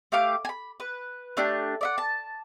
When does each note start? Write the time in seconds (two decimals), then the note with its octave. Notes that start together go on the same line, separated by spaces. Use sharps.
0.12 A3 G4 F5 D6
0.45 G#5 B5
0.80 B4
1.37 A3 D4 G4
1.81 D5 E5 F#5
1.98 A5